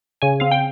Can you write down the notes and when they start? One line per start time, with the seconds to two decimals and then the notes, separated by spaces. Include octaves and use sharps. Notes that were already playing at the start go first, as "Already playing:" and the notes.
0.22 C#3 G#5
0.40 C4 F5
0.51 G5